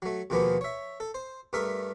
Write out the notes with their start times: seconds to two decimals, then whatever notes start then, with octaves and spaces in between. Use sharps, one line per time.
0.02 F#3 A3
0.30 D#2 B2 F3 G#3 A#3 B3
0.61 C#5 E5
1.00 A4
1.14 C5
1.53 G2 A3 A#4 E5 D#6